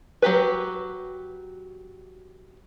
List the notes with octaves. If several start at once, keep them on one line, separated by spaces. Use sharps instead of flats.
F#3 A3 G4 B4